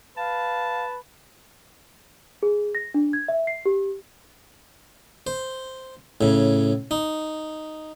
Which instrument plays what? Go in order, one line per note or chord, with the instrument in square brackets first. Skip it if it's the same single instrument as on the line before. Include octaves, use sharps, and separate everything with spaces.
[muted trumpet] B4 [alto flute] F5 [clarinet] A5
[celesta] G#4
A#6
D4
G#6
E5
C7
G4
[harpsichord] C5
A2 C#3
D#4